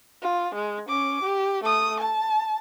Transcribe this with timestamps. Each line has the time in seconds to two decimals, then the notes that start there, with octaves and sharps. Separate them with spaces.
0.23 F4
0.55 G#3
0.89 C#4 D6
1.24 G4
1.64 A3 D#6
2.01 A5